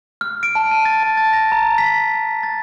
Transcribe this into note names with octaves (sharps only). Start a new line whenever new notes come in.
F6
D7
A5
D#7
A6
A5
A6
A#6
A#5
B6
B6
A6